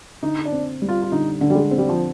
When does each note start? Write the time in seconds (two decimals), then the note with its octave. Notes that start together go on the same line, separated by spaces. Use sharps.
0.23 D3 D#4
0.45 D4
0.52 C4
0.82 G3
0.89 F4
1.02 F4
1.12 D3 D#4
1.41 D3
1.50 G3
1.55 G#3
1.71 C4
1.78 G3
1.89 F3